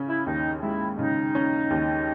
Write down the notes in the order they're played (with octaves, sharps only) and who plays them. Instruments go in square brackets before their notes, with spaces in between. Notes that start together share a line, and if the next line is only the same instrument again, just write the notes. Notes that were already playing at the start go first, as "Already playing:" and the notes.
Already playing: [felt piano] C#3 C#4
[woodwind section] E4
[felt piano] D#2 [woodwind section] D#4
[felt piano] G#3 [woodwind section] E4
[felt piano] C#3 [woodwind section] D#4
[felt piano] C#4
D#2